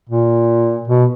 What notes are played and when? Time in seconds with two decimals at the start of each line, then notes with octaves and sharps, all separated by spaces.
0.10 A#2
0.88 B2